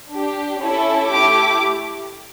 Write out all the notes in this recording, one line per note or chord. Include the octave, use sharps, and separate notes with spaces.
D4 G4
C#4 E4 A4
A3 E4 G4 D6